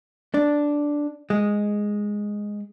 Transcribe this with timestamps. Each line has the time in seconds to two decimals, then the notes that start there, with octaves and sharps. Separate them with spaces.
0.34 D4
1.30 G#3